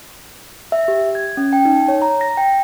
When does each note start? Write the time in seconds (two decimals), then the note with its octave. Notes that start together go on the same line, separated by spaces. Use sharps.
0.72 E5
0.88 G4
1.15 G#6
1.37 C#4
1.53 G5
1.65 D#4
1.88 C#5
2.02 A#5
2.21 A#6
2.37 G5